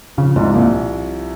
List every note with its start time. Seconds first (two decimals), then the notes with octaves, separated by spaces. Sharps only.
0.17 C#3 F3
0.36 C2 G#2
0.54 C2 A#2